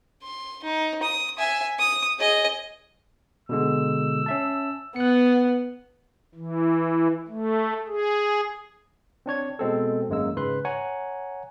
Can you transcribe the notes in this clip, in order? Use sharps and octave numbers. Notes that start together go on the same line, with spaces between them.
C6
D#4
D#6
E5 G#5
D#6
G#4 D#5
B2 D3 G#3 E6
C#4 E5 A5
B3 F#6 C#7
E3
A3
G#4
C4 D4 C#5 G#6
B2 G#3 C4 A4
G#1 F#2 G#3 A#3 E6
G#2 C#3 B4 C6 F#6
C#5 F#5 G#5 A#5